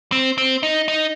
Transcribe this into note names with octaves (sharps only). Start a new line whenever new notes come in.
C4
C4
D#4
D#4